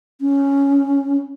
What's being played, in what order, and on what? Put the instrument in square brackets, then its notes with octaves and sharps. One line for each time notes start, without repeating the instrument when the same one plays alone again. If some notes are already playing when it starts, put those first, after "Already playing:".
[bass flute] C#4